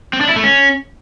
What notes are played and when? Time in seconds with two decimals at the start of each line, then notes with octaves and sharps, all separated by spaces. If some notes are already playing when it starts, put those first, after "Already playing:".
0.13 C4
0.21 D4
0.28 E4
0.36 A3
0.43 C#4